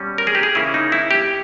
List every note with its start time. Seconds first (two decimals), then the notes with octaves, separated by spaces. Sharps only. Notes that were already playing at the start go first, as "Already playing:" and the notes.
Already playing: B2 G3 C#4
0.18 A#4
0.27 G#4
0.35 G4
0.43 G#4
0.55 C#3 E3 A#3 C#4 E4
0.74 D#4
0.92 E4
1.11 G4